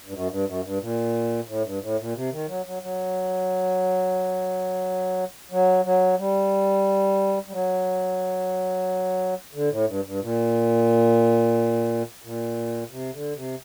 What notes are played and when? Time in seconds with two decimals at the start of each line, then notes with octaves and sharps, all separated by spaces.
0.06 G2
0.13 F#2
0.30 G2
0.46 F#2
0.63 G2
0.80 A#2
1.48 A2
1.64 G2
1.82 A2
1.98 A#2
2.15 C3
2.31 D#3
2.48 F#3
2.66 F#3
2.83 F#3
5.51 F#3
5.85 F#3
6.18 G3
7.47 G3
7.53 F#3
9.54 D3
9.70 A2
9.88 G2
10.05 G2
10.21 A#2
12.23 A#2
12.91 C3
13.13 D3
13.35 C3